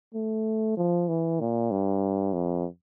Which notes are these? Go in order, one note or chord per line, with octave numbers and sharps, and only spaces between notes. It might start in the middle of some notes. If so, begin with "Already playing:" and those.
A3
F3
E3
A#2
G2
F2